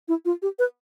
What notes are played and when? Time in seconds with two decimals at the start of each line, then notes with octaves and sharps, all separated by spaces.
0.08 E4
0.25 F4
0.42 G4
0.59 B4